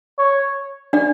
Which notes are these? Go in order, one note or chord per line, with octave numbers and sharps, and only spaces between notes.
C#5
D4 D5